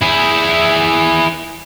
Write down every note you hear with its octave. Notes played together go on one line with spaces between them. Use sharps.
E4 G#4